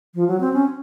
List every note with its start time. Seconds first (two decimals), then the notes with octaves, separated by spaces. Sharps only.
0.15 F3
0.28 F#3
0.40 C4
0.53 C#4